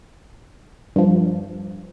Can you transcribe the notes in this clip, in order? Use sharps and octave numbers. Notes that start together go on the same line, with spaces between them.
G2 F3